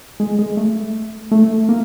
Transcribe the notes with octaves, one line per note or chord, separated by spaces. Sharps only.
G#3
G#3
A3
A3
A#3